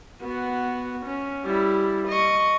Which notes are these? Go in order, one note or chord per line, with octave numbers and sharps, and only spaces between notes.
B3 F#4
C#4
G3 E4
D#5 C#6